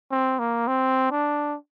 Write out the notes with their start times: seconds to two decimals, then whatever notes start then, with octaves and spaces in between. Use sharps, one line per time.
0.11 C4
0.39 A#3
0.67 C4
1.11 D4